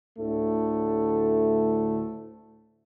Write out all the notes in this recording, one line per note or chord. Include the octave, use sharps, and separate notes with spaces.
D2 A2 D3 A3